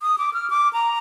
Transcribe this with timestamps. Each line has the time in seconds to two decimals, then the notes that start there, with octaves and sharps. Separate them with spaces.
0.02 D#6
0.18 D6
0.34 F6
0.50 D6
0.73 A#5